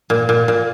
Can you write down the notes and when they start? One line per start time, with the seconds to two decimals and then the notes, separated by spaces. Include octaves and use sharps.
0.10 A#2
0.29 A#2
0.48 A#2